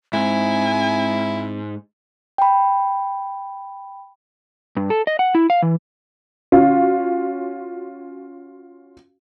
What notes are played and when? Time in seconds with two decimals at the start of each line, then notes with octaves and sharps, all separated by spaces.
0.13 G#2 C4 E4 G#5
2.38 G5 B5
4.77 G2
4.90 A4
5.07 D#5
5.19 F#5
5.35 E4
5.50 F5
5.62 E3
6.52 C#4 F4 F#4